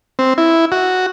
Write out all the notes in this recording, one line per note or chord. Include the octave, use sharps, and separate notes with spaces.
C4
E4
F#4